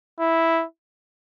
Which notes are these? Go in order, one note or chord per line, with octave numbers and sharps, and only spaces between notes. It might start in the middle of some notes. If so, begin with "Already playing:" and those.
E4